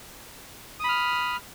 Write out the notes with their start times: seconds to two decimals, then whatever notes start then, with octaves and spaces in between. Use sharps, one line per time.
0.79 D#6
0.84 B5
0.89 F6